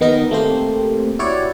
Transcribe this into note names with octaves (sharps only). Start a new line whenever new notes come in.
D#3 B3 D#4 A#4 D#5
A3 A#3 C4 G4 C5
E4 F#4 G4 C#5 D5